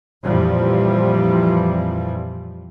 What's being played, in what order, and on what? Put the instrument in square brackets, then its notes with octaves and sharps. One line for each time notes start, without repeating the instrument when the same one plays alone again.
[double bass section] F2 A#2 E3 F3 G3